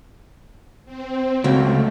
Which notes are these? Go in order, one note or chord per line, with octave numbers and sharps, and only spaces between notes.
C4
C#2 F#3 A3 A#3